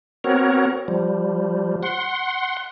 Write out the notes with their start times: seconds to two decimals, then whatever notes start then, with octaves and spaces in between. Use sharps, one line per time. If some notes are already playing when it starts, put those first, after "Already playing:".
0.24 B3 C4 F#4 A#4 C#5
0.88 F3 G3
1.83 F#5 C6